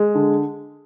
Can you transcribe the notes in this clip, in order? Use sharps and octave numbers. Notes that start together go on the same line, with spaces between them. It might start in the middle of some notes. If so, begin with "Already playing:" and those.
Already playing: G#3
D3